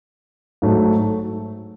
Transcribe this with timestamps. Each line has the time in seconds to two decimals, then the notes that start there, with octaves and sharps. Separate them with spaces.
0.62 G#2 F#3 A3